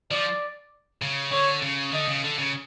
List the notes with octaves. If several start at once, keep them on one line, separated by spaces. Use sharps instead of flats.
F3 D5
C#3
D3 C#5
C#3
D3 D#5
C#3
D3
C#3